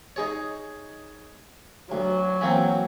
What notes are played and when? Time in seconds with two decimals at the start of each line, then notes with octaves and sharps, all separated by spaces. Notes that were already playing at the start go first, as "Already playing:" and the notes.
0.16 D#4 G#4 C#5
1.92 D2 F#3
2.41 E3 A#3 C4